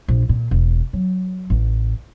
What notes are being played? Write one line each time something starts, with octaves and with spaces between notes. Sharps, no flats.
A#1
A#2
E1
F#3
A1